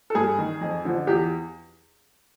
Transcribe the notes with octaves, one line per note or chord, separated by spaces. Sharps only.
A4
G2 G#4
D#3
F2
D3 F3
E2 G4